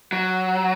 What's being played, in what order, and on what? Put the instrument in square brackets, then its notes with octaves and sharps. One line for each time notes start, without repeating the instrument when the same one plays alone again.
[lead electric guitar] F#3